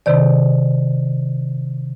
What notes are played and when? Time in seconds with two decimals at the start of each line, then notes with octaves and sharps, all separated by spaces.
0.06 C3 D#3 D5